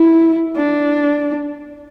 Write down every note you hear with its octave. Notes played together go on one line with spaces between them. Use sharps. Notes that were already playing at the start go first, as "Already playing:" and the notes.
Already playing: E4
D4